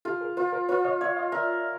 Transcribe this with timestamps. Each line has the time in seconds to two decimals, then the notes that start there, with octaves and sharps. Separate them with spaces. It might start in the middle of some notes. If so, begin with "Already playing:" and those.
0.05 F4 G4 A4
0.21 G#4 A#4
0.37 F4 A#4 C5
0.52 A#4 C5
0.69 F4 B4 C#5
0.85 C#5 D#5
1.00 C#5 D5 E5
1.16 D#5 F5
1.32 A#4 D5 E5